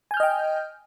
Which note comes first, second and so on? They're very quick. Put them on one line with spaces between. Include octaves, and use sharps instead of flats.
G#5 G6 F6 D#5 G5